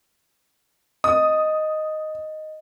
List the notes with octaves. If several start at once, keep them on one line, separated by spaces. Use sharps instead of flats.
D#5 D#6